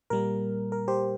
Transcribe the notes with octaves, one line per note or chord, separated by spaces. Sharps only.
A#2 G3 A#3 A#4
A#4
G4 C5